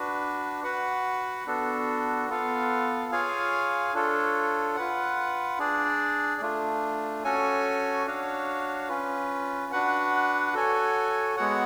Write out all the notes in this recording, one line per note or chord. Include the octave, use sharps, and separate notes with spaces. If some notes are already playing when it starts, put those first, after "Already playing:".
Already playing: D4 F#4 B4
F#4 B4 F#5
B3 D4 F#4 A4
B3 F4 A4 F5
F4 G#4 C#5 F5 G#5
D4 F4 A4 C#5
F4 B4 F#5
D4 G#4 D5
A3 D4 F4
C#4 F#4 A4 C#5 G#5
D4 F#4 C#5 F5
C#4 F4 B4
D4 F#4 B4 F#5
F#4 A4 C#5 G#5
G#3 B3 F#4 C#5 F#5